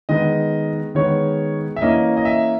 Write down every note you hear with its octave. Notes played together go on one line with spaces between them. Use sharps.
D#3 G#3 B3 D#5
D#3 G#3 B3 C#5
E5
E3 A#3 C#4 D#5
D#5
E5